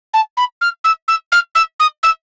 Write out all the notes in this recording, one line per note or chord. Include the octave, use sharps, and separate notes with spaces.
A5
B5
F6
E6
E6
F6
E6
D#6
E6